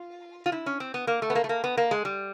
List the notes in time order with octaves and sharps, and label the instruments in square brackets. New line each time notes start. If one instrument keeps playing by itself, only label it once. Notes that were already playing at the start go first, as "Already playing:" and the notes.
Already playing: [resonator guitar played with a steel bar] F4
F4
E4
C#4
C4
B3
A#3
A3
B3
A#3
A3
A#3
B3
A#3
G#3
G3